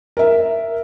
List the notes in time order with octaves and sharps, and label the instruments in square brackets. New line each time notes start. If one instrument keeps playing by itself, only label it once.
[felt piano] A#4 E5